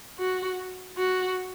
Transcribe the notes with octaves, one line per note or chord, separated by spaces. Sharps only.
F#4
F#4